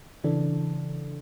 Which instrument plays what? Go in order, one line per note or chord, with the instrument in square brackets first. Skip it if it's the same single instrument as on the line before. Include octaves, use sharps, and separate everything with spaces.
[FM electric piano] C#3 E3 D4 A4